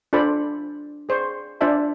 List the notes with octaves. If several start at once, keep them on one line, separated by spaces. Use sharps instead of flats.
D4 F4 A4 C5 B5 D6
G#4 C5 D5 C6 C#6
D4 F4 C5 D5 E5 A5